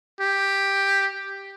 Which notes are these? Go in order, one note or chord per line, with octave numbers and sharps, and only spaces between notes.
G4